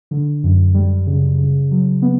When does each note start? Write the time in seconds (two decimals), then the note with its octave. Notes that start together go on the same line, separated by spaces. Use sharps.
0.11 D3
0.44 F#2
0.74 G3
1.07 C#3
1.38 C#3
1.71 F#3
2.02 B3